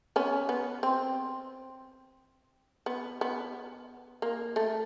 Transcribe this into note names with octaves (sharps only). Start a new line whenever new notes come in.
B3 C#4
B3
C4
B3
B3
A#3
A3